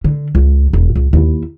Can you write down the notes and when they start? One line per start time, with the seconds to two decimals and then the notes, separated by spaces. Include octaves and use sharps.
0.04 D3
0.35 C#2
0.73 E1
0.95 C#2
1.13 D#2 E4